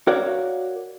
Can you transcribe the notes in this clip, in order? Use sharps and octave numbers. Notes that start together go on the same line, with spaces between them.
F#4 A#4 C#5 D5 F5 F#5